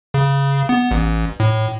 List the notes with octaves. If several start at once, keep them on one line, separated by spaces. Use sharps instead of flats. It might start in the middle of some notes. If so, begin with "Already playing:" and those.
C#3
B3
A1
A2